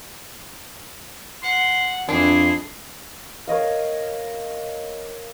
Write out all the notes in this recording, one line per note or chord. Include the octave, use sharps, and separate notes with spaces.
F#5 C6
F2 D4 E4 G#4 C6
A#4 C#5 D#5 F5